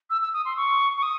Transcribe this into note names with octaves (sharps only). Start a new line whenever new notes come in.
E6
E6
D#6
C6
C#6
C#6
D#6